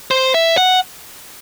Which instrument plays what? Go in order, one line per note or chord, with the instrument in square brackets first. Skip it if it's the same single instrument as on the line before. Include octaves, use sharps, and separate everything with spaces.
[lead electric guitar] C5
E5
F#5